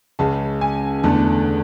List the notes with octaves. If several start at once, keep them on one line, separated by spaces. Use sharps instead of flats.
C#2 C#3 G#3 A5
G#5
E2 D3 A3 A5